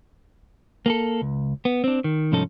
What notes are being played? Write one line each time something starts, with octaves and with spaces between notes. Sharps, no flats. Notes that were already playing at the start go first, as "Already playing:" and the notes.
A#3 G#4 A4
C#2
B3
C4 D4
D#3
C2 G#2 F3 C#4 D#4 A4